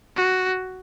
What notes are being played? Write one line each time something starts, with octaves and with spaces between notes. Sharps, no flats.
F#4